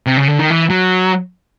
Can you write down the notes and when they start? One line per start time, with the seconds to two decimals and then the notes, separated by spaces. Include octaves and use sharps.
0.06 C3
0.17 C#3
0.28 D3
0.39 D#3
0.50 E3
0.70 F#3